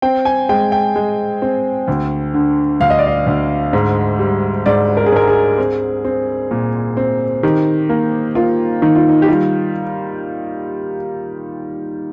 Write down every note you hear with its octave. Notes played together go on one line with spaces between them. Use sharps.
C4 G5
G#5
G#3 G5
G5
G#3
C4
D2
D3
D2 F5
D#5
D5
D#5
D2
G#2
G3
G#2 D5
A#4
G#4
G#2 A#4
G#4
C4
C4
A#2
C4
D#3 G4
A#3
A#3 F4
D#3 D#4
F4
D#4
G4
G3 F4